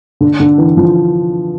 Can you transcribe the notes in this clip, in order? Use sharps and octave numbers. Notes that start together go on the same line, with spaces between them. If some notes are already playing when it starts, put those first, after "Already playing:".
D3
D3
E3
F3